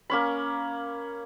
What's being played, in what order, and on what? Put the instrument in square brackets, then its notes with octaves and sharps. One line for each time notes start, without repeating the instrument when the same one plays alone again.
[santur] A#3 C#4 B5